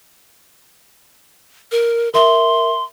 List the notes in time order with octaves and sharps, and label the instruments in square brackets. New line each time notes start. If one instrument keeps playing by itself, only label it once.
[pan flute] A#4
[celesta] A#4 E5 [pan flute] C6